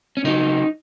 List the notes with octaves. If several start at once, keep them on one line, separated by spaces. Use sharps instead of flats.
C#4
C#3 F#3 D#4